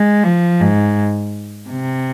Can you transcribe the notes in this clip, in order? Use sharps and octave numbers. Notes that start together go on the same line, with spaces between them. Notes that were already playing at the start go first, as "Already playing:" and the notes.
Already playing: G#3
F3
G#2
C3